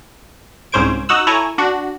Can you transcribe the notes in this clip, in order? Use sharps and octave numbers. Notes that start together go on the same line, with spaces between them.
C2 G#2 C#4 C5 G#6 D7
D#4 F#4 F#5 E6
E4 A4 C#5 G#5 A#5
D4 F#4